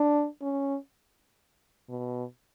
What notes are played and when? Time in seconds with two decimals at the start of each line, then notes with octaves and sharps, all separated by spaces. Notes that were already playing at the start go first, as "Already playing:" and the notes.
Already playing: D4
0.42 C#4
1.89 B2